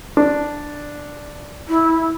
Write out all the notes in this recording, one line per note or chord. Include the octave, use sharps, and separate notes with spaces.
D4
E4